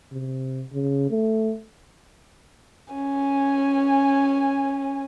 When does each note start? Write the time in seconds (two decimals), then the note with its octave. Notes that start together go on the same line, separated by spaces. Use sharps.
0.12 C3
0.73 C#3
1.10 A3
2.93 C#4 G#5